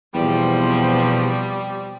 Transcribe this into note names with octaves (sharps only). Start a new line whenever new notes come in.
E2 B2 F3 G3 C4